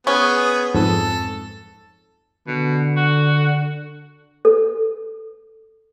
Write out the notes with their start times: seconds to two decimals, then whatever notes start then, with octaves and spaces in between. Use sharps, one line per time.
0.07 B3 C#4 G#4
0.75 F2 G#2 A4
2.48 B2 D3
2.97 F#4
4.45 A4